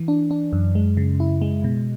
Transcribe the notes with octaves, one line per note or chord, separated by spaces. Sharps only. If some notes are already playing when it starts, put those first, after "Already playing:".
Already playing: E3
D4
D4
F#2
G#3
C#3
E4
G#3
B2